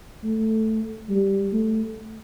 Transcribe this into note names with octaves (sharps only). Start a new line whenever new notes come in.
A3
G3
A3